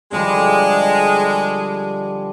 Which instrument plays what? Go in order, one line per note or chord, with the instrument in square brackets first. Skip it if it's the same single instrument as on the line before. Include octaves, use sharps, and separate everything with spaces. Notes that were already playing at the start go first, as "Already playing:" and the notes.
[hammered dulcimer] D3 F3 G3 [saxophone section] G#3